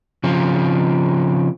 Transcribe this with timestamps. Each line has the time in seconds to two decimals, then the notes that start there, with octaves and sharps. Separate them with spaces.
0.24 C#3 F3 C4